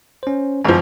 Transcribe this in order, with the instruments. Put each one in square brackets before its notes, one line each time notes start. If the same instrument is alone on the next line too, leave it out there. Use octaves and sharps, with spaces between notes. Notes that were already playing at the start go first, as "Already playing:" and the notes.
[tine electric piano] C#4 C5
[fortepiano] G#1 F3 [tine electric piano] F#2 G#5